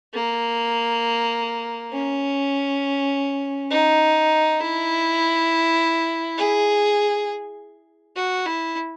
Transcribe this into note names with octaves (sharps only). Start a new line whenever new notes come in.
A#3
C#4
D#4
E4
G#4
F#4
E4